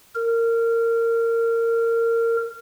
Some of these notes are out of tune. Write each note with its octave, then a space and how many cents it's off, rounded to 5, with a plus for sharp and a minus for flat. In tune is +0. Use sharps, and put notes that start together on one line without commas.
A#4 -20